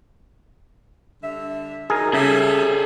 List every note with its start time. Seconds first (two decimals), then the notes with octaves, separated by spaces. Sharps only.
1.22 D3 G3 E5
1.90 F#3 D#4 G#4 A#4
2.13 C#3 G3 G#4 A4 E5